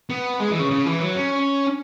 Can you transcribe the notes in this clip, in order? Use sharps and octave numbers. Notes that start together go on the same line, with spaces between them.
B3
G#3
E3
C#3
C#3
E3
F#3
C#4